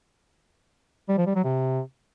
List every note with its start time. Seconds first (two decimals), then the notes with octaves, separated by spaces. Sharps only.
1.09 G3
1.18 F3
1.27 G3
1.35 F#3
1.44 C3